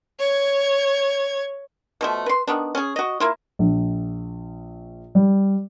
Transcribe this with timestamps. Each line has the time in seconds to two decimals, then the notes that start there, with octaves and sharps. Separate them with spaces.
0.19 C#5 G#6
2.01 B2 F3 A3
2.26 B4 C6
2.47 D#3 B3 D4
2.75 C#4 G#4
2.96 F#4 D#5
3.20 A#3 E4 F4
3.59 A#1
5.15 G3